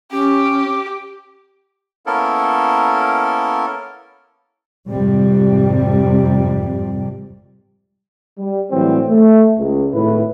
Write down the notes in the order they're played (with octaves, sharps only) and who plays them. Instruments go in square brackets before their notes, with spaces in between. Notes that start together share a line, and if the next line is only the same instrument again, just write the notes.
[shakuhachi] C#4 [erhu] G4
[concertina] A#3 B3 C#4 E4 A4 A#4
[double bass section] G#1 F2 C3 G3
[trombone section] G3
A2 E3 F#3 G3 C4
A3
C#2
G#1 A2 E4 B4